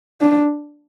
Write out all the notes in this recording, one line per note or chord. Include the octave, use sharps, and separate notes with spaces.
D4